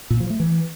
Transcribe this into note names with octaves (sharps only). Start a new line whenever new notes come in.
A#2
F3
A3
E3